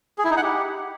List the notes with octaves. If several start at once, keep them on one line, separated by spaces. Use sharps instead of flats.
G#4
E4
D#4
F#5
G4